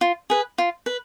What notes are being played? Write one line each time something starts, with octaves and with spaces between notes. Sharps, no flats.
F4
G#4 B4
F4
B4